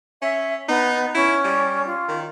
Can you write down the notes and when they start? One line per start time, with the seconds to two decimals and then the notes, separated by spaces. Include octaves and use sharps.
0.22 C#4 E5
0.68 B3 D#4
1.15 C#4 E4
1.44 G3
1.86 F4
2.08 D#3